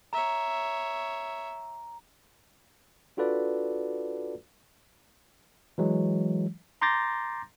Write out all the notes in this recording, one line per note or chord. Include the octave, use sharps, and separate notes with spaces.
C#5 E5 A#5
D4 F4 F#4 A4 B4 D5
E3 F#3 G#3
A#5 C6 D6 G6 A6 A#6